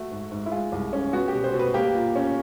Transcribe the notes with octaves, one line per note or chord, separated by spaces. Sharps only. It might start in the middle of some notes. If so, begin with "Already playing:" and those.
Already playing: A3 F#4
G#2
G#2
E4
G#3 F4
C2
C#4
B3 F#4
G4
B2
C5
B2
B4
A#3 G4
A#2
C#4